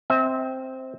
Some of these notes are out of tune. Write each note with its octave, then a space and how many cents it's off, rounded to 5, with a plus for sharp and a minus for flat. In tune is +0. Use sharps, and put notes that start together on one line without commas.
C4 +0 E5 -35